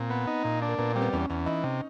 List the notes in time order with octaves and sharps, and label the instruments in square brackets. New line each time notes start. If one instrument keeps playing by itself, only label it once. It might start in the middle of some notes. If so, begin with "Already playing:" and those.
Already playing: [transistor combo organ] A#2 [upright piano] C4
[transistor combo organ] B3
D#4
A#2
D4
[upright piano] A#3
[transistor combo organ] A#2 [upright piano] B3
[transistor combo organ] G3 [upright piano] C4
[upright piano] B3
[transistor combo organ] E2 [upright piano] C#4
[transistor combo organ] E2 [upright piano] C#4
[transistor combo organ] E3 [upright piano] D#4
[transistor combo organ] C3